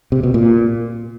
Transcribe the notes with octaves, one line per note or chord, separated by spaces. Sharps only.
C3
B2
A#2